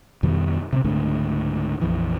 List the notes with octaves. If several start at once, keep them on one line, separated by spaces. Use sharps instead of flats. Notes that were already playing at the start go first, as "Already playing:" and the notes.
F2 B2 D#3 G3
C3 A#3 C4
C#2 G#2 D3 A3
A#1 F2 E3